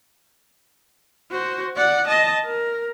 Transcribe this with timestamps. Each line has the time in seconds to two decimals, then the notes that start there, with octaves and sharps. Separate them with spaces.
1.32 F#4 C5
1.77 D5 F#5
2.08 D#5 A5
2.45 A#4